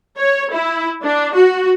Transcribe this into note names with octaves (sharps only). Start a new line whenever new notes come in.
C#5
E4
D4
F#4